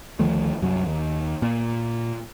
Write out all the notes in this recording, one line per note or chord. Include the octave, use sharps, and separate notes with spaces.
D2 D#3 F3 A3
C2 F#2 F#3
D#2
A#2